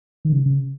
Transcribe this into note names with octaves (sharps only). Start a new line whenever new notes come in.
D#3
C#3
C#3